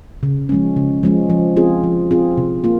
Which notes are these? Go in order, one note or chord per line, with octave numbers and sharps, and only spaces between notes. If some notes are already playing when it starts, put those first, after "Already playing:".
C#3
F3 G#3 C#4
C#3
F3 G#3 C#4
F3
C4 F4 G#4
F3
C4 F4 G#4
C3
A#3 F4